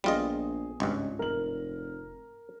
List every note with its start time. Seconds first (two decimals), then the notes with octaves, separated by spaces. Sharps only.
0.04 A#1 G3 B3 F4 G#4 D#5
0.80 G#1 C#2 G2
1.19 F1 A#4 F#7